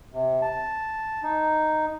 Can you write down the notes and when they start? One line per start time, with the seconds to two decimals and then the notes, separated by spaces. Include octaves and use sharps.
0.14 C3
0.42 A5
1.23 D#4